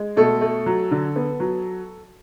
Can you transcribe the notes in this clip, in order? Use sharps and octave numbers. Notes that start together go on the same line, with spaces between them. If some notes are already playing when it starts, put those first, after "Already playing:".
Already playing: G#3
B2 A3 A4
A3
F#3
D3
B3
F#3